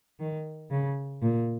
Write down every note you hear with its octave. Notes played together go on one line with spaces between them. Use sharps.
D#3
C#3
A#2